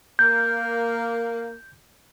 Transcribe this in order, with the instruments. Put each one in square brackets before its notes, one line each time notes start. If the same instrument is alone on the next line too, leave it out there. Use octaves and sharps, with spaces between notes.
[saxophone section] A#3 [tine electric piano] G6